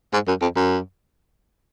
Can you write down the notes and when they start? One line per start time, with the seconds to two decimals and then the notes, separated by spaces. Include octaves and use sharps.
0.13 G#2
0.28 F#2
0.42 F2
0.56 F#2